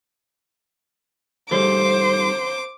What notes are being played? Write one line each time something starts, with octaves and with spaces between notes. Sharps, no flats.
G#2 G3 A3 C5 D6